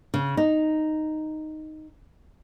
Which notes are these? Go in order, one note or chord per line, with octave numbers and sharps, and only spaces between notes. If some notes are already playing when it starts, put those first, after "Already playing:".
C#3
D#4